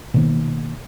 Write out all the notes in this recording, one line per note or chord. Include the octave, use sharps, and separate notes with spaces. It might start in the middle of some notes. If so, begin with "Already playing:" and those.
B2 D#3 A#3